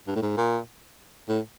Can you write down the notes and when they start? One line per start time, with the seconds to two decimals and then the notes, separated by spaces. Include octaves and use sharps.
0.07 G2
0.16 A2
0.22 G#2
0.37 A#2
1.29 A2